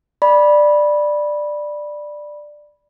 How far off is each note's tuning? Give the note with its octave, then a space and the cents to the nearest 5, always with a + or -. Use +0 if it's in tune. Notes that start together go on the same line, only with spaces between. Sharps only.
D5 +10 B5 -15